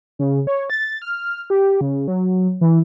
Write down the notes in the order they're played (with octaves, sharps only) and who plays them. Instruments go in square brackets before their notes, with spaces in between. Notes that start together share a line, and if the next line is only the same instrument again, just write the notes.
[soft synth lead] C#3
C#5
A6
F6
G4
C#3
F#3
E3